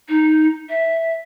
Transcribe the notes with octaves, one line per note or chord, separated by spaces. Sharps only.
D#4
E5